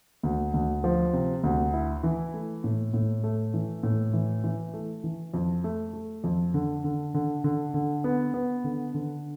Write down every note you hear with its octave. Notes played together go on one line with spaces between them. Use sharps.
D2
D2
F3
C3
D2
E4
E3
A3
A2
A2
A3
E3
A2
E3
E3
A3
E3
F2
A3
A3
F2
D3
D3
D3
D3
D3
B3
B3
D3
D3